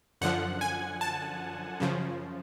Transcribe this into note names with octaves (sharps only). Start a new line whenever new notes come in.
F#2 D3 F3 F#5
G#5
A5
F#2 C#3 F3